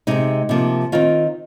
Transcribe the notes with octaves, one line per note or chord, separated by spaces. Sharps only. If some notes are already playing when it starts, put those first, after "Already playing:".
C3 G#3 C4 D#4
C3 F3 A#3
D#3 C4 F4